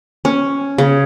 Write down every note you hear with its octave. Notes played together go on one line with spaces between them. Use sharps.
C#4
C#3